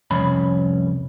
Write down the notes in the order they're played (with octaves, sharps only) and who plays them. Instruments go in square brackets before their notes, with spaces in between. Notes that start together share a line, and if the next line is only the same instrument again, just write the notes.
[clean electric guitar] C2 F2 C#4 B5